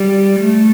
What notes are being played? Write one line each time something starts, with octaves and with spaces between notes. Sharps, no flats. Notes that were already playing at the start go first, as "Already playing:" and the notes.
Already playing: G3
A3